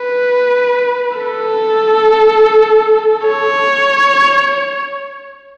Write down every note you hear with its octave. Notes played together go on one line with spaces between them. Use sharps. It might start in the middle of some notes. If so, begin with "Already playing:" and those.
Already playing: B4
A4
C#5